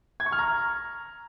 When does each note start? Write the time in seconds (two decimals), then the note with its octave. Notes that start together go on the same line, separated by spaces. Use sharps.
0.20 G#6
0.26 C#6
0.32 F6
0.39 A#5